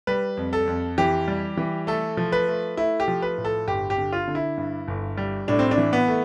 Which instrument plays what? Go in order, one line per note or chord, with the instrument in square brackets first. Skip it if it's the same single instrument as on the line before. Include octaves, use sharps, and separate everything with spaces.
[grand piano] G3 B4
F2
A4
F2
E3 G4
G3
E3
A3 A4
F3
B4
A3
A3 E4
G4
F3
B4
A2
A4
G1 G4
G4
D3
F4
D3
E4
G2
G1
G3
A2 D4
C4
D4
E3
B3
A3